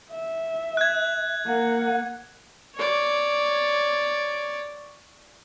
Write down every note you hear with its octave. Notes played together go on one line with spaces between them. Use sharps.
E5
F#6 G#6
A#3 F#5
C#5 D5